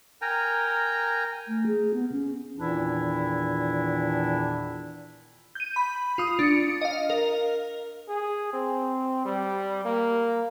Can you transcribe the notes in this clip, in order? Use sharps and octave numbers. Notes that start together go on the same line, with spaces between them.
A#4 G5 G#5 A#5
A3
G#4
B3
C#4
E2 A#2 D#3 E3 D4 E4
G6 D#7
B5
F4 D#6
D4 C#7
D#5 F5
A#4
G#4
C4
G3
A#3